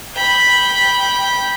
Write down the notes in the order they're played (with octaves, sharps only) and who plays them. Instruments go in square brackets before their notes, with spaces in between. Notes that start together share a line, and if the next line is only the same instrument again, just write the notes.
[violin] G5 B5